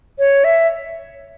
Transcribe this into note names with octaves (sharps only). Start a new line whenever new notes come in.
C#5
E5